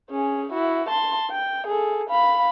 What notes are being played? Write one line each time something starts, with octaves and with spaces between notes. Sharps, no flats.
C#4 G#4
E4 F#4
A5 C6
G5
G#4 A4
F5 B5